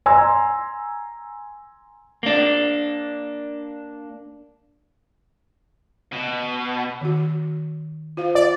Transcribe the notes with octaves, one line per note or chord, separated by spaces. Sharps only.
G#5 A#5 C6 E6
A#3 D4
B2
D#3 F#4
F4 C5 F5
D5